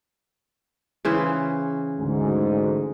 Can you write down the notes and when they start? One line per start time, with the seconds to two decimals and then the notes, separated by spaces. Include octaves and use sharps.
1.05 C#3 E3 C5
1.98 D2 G#2